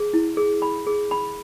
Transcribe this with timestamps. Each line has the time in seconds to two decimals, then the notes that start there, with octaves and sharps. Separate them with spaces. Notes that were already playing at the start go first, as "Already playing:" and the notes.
Already playing: G#4
0.13 E4
0.37 G#4
0.62 B5
0.87 G#4
1.11 B5